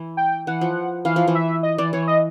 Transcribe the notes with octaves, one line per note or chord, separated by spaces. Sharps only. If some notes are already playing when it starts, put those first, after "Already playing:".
Already playing: E3
G5
E3 F#5
F3
E3 F5
F3
E3
E5
D#5
E3 D5
E3 C#5
D#5